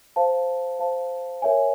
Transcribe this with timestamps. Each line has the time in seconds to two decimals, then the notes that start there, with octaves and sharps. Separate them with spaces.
0.16 C5 F5 A5
0.79 C5 F5 A5
1.42 A#4 C#5 E5 G#5